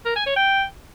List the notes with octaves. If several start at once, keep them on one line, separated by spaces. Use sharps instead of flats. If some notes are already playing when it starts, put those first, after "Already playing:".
A#4
G#5
C#5
G5